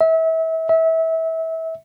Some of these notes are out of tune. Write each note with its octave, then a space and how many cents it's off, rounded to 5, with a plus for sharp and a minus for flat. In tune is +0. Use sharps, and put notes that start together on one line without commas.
E5 -30
E5 -25